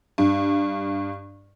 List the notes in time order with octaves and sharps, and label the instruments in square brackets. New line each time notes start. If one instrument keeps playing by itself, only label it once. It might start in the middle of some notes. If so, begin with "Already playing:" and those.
[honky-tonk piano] G2